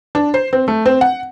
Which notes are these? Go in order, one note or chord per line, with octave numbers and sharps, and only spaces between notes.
D4
C5
C4
A3
C4
F#5